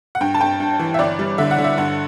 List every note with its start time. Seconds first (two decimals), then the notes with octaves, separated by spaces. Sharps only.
0.15 F#5
0.21 G2 G5
0.34 A5
0.41 G2 G5
0.60 G2
0.79 E3
0.94 E5
0.99 G1 D5
1.19 G3
1.38 D3 E5
1.51 F#5
1.58 D3
1.64 E5
1.77 G2 F#5